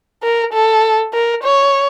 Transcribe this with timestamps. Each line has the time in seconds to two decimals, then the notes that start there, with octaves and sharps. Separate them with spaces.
0.23 A#4
0.53 A4
1.13 A#4
1.44 C#5